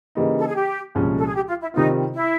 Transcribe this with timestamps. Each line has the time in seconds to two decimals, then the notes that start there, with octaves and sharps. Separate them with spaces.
0.15 C#3 E3 G3 A#3 D#4
0.38 A4
0.47 G#4
0.55 G4
0.95 C2 A#2 F3 G#3 C#4
1.18 A4
1.26 G#4
1.35 G4
1.48 F4
1.61 E4
1.74 C3 D#3 G3 C4 D#4 F4
2.14 E4